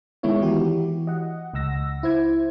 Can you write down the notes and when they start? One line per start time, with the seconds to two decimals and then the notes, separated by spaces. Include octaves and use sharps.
0.23 D#3 G#3 B3 E4 C#5
0.41 E3 E4 F#4 G4
1.07 D#5 F#5
1.54 C#2 F#5 E6 A#6
2.03 E4 C5 G#6